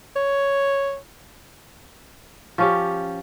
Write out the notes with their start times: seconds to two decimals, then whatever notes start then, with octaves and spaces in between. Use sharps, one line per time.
0.16 C#5
2.58 F3 C#4 G4